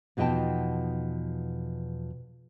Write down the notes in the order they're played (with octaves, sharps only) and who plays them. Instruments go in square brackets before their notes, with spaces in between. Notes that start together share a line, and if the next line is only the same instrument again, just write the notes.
[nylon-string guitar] E2 B2 F3 D#4 G5 A5